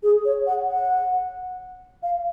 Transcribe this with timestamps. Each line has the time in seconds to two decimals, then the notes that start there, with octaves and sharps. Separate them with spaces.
0.03 G#4
0.25 C#5
0.47 F#5
0.69 F#5
2.03 F5